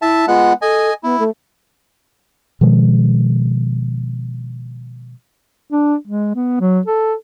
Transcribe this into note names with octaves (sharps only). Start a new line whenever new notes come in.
E4 E5 A5
G#3 B3 F4 F#5
A4 D#5 G#5
B3 E4
A3
B2 D#3 F3 G#3
D4
G#3
B3
F#3
A4